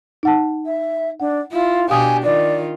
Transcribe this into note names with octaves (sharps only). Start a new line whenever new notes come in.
D#4 F#5 A5
E5
D4 F#5
E4 F4
B2 D4 G4 F5 G#5 D#6
D#3 F4 D5